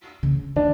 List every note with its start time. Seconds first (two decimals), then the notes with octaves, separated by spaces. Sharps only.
0.23 C#3
0.56 D3 D4